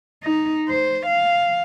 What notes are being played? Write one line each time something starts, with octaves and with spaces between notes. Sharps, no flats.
D#4
C5
F5